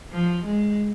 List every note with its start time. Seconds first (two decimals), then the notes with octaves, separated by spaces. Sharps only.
0.13 F3
0.45 G#3